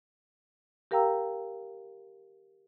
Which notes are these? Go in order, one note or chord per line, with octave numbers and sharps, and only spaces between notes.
G4 A#4 F5 G5 A#5 E6